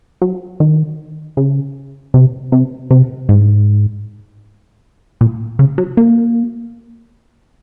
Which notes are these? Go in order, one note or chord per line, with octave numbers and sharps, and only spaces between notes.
F#3
D#3
C#3
C3
C3
C3
G#2
A#2
C#3
F#3
A#3